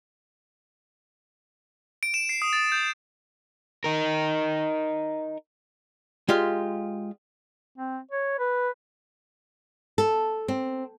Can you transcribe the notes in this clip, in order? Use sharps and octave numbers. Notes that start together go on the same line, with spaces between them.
D7
E7
C7
D#6
A6
G6
D#4 A#4
G#3 F4 G4 F5
C4
C#5
B4
A4
C4